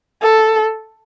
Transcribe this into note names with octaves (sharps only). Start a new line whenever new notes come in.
A4